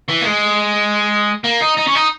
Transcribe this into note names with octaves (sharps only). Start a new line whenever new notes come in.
E3
A#3
G#3
A#3
D#4
D#4
C#4
D#4